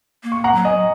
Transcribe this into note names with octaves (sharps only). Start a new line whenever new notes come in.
A#3
C#6
F#5 A#5
F#3
D#5 G#5